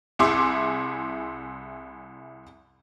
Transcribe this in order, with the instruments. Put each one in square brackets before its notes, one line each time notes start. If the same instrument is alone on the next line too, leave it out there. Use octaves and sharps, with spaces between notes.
[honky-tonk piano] C2 E4 G#4 C6 D6